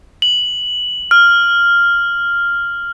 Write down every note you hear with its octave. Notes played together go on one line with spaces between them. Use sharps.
F#7
F6